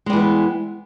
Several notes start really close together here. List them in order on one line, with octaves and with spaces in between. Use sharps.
G#3 G3 E3 B3